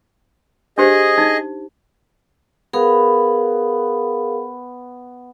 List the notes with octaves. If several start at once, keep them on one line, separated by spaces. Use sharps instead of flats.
D4 G4 G#4 C5 D#5
D#4
B3 G#4 A#4 F5